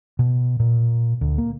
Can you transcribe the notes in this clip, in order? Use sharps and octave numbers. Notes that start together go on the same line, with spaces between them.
B2
A#2
D2
A#3